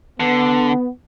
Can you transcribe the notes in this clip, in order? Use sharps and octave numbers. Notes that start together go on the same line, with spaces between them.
D3 B3